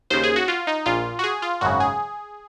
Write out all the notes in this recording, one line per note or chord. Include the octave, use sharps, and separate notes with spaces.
D#2 C#3 C5
G#4
F#4
F4
D#4
A#1 A#2 F4
F#4
G#4
F4
G#1 F#2 C#3 F#4
G#4